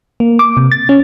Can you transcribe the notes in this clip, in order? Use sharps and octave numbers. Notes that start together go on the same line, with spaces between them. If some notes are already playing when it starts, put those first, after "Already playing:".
A#3
D6
C3
A6
C#4